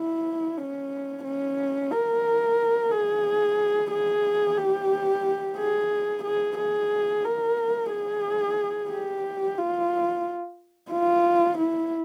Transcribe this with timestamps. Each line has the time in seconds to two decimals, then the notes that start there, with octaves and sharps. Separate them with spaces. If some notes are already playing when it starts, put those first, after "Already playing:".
Already playing: E4
0.58 C#4
1.24 C#4
1.91 A#4
2.92 G#4
3.92 G#4
4.58 G4
5.58 G#4
6.24 G#4
6.58 G#4
7.25 A#4
7.92 G#4
8.91 G4
9.58 F4
10.92 F4
11.59 E4